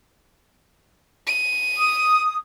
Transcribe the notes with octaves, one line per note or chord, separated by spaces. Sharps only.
D#7
D#6